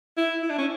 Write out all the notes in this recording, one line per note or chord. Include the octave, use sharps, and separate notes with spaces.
E4
E4
D4
C#4